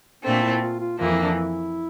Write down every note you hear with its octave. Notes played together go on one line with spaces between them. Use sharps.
A#2 A3 C4 D4
E4
F4
F4
F2 E3 A#3 F4
E4
D4
E4